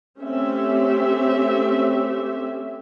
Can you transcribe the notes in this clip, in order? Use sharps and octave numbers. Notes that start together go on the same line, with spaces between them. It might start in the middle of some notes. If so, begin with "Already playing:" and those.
A3 C4 C#4 G4 E5